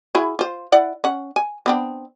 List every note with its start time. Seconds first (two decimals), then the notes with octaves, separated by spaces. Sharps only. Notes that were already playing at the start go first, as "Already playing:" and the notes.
0.15 E4 F#4 G#4
0.39 F4 C5
0.72 E4 D5 F#5
1.04 C#4 F#5
1.36 G#5
1.66 B3 C4 D4